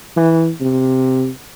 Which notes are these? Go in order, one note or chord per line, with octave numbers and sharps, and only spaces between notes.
E3
C3